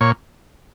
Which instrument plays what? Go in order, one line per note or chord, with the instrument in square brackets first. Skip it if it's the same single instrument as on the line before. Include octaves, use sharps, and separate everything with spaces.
[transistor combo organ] A#2 C#5